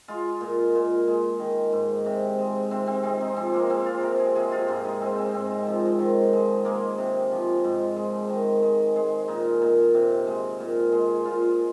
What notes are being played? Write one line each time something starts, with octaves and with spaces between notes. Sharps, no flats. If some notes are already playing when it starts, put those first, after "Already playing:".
G#3 F4
A#2
A#2
G#3
D#3
G#2
C3
G#3
C3 C4
C4
G#3 C4
D#4
F3 C4
A#3
G#3 C4
F4
C3 A#4
G#4
C3 G#4
F4
G#2 D#4
D#4
G#3 C4
C4
G#2 C4
F3
D#3
G#3
G#3 A#3
C3
F3
G#2
G#3
D#3
G#3
G#3
A#2 D#4
A#2
C3
G#3
A#2
G#3
A#2 F4